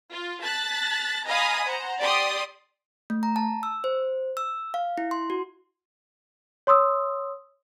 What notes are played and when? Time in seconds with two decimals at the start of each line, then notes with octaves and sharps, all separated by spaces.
0.11 F4
0.43 A5 F#6 A6 B6
1.26 D#5 F5 G#5 A#5 B5 D#6
1.66 C5 F#5 A#5
2.01 G4 D5 C6 D#6
3.10 A3
3.23 A#5
3.36 A5
3.63 E6
3.84 C5
4.37 E6
4.74 F5
4.98 E4
5.11 C6
5.30 F#4
6.67 C#5 C6 D#6 E6